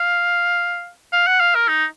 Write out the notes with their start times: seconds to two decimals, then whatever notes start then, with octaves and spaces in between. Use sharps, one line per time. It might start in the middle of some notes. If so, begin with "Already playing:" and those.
Already playing: F5
1.13 F5
1.27 F#5
1.40 F5
1.55 A#4
1.68 D#4